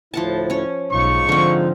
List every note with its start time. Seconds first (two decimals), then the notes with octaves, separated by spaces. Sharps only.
0.14 D2 A2 F3 E4 F#5 A5
0.50 C#4 C#5
0.91 B1 G#2 D#4 F4 C#6
1.29 D3 F3 C4